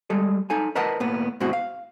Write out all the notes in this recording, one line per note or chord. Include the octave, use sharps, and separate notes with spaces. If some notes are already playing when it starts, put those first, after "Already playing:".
G3 G#3 A4
D#4 A4 G#5
A#4 B4 D#5 F#5 A5
A2 A#3 B3
G#2 B2 C4 E4 F#4
F5